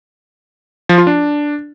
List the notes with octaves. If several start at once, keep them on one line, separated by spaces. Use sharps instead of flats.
F3
F4
D4